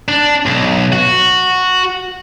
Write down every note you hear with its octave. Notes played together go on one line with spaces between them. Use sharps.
D4
B1
F#4